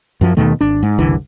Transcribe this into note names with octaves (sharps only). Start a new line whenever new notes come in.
F#2 F3 F#3
D#2 B2 D#3 A3
G#1 D4
G#2
F#1 C2 D3 E3